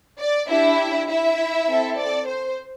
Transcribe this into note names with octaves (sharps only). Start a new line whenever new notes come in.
D5
D4 E4 G4 E5
E4 E5
C4 A4
D5
C5